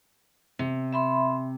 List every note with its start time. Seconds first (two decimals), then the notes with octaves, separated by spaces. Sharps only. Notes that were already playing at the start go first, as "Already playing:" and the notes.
0.59 C3
0.93 E5 B5 C6